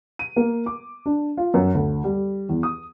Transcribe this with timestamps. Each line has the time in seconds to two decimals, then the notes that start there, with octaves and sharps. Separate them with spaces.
0.19 D#7
0.36 A#3
0.66 D6
1.06 D4
1.37 F4
1.54 F#2
1.74 D2
2.04 G3
2.49 E2
2.63 D#6